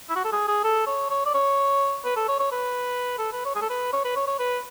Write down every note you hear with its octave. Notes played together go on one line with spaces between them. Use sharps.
E4
F#4
A4
G#4
G#4
A4
C#5
C#5
D5
C#5
B4
A4
C#5
C#5
B4
A4
B4
C#5
G#4
A4
B4
C#5
B4
C#5
C#5
B4